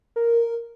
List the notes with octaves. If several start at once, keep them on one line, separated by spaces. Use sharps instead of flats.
A#4